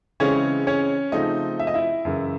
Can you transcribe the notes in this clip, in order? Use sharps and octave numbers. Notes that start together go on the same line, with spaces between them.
C#3 E3 G#3 C4 C#4 C#5
C#4 C#5
C#3 F3 A3 C4 D#4 D#5
E5
D#5
E4 E5
F#2 C#3 E3